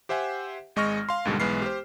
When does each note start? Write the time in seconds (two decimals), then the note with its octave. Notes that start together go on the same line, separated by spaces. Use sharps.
0.09 G4 C5 E5 F#5 G#5
0.76 G#1 G#3 D#5 C#6 F6 A#6
1.09 F5 C6
1.25 D#2 G#2 B2 D3 G3 G#3
1.40 B1 E3 G#3 B3 F6 C7
1.62 G4 C5